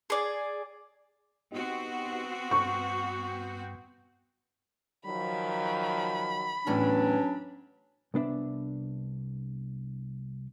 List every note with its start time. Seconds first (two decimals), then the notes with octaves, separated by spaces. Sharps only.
0.10 G#4 D5
1.52 B3 C4 D#4 F#4 G4
2.51 G2 G5 C#6
5.05 D#3 F3 F#3 B5
6.67 E2 A2 E3 F#3 C#4 D4
8.14 C2 B3 D4 E5